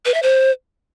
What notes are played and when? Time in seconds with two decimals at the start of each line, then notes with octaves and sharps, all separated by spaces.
0.05 B4
0.14 E5
0.23 C5